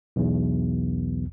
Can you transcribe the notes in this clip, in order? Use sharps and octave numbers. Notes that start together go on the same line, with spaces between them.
B1 E2